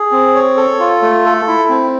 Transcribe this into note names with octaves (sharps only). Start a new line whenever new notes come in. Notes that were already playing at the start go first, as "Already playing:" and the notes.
Already playing: G#4
C4
C#5
A4
F4
A3
A4
E4
C4